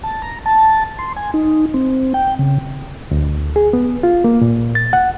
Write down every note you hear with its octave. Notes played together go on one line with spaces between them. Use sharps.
A5
A#5
A5
C6
G#5
D#4
C4
G5
C#3
D2
G#4
B3
F4
A#3
A#2
A6
F#5